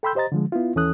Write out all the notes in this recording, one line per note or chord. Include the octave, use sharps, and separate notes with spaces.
A4 G5 B5 C6 E6 G6
G4 C5 D#5 A#5 A6
D3 F3 G#3
B3 E4 F4
D#2 E3 C#4 A4 D#6 F#6